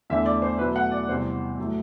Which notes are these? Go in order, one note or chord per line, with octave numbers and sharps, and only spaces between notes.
E2 D3 A3 E5
D5
C5
B2 F#3 A3 B4
F#5
D5
E2 C3 G3 C5
A2 F#3 A3